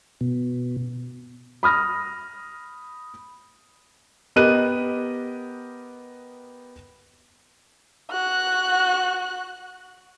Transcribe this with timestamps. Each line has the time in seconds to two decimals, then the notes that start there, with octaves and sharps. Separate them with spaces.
0.21 B2
1.63 B5 D#6 F6 A#6
4.36 B3 G4 A#4 D#5 F#6 D#7
8.11 F#4 F#6